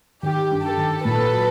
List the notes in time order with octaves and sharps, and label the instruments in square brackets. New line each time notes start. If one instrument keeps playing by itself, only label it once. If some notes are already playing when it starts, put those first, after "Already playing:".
[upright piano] D#3 [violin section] G4
[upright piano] G2
[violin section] G4 A4
[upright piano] D#3
[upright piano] A#2 [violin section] A4 B4
[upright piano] F#3